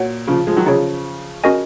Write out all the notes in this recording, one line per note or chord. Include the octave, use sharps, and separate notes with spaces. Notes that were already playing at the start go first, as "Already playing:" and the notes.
Already playing: A#2 F#4 C#5 F#5
C#3 F3
F3 G#3
D#3 F#3
C#3 F3 D#4 G#4 C#5
C#4 F#4 A#4 D#5 G#5